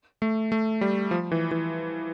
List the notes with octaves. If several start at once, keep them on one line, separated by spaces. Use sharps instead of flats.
A3
A3
G3
F3
E3
E3